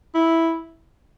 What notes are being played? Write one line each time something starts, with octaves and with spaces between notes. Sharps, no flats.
E4